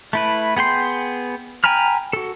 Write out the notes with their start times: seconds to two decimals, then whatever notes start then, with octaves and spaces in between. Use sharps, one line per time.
0.13 A3 E4 B4
0.57 B3 G#4 G5 C6
1.64 G5 G#5 A#5 B5 F6
2.13 F#4 A4